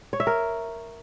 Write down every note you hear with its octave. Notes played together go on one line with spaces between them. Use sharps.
C#5
E5
A#4